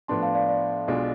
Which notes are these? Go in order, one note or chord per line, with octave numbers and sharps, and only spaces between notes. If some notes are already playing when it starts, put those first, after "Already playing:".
A2 F3 B3 D4 A5 C6
F5 A5
D5 F5
D5
B1 B2 G#3 D4 F4